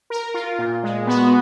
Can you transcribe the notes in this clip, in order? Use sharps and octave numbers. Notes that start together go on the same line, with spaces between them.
A#4
F4
A#2
G#3
B3 F#4